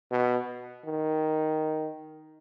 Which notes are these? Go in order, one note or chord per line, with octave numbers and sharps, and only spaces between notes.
B2
D#3